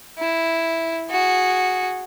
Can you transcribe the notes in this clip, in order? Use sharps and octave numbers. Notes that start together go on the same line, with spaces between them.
E4
F#4 G#4